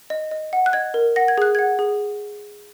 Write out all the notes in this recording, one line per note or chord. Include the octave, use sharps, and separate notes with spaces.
D#5
D#5
F#5
F#6
D#5 G#6
A#4
F#5 A#6
G#6
G#4 F#6
F#5 G#6
G#4